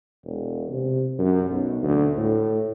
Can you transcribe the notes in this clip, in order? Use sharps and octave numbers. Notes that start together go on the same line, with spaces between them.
E1
C3
F#2
B1
D2
A2